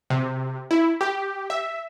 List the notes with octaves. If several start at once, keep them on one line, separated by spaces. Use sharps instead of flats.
C3
E4
G4
E5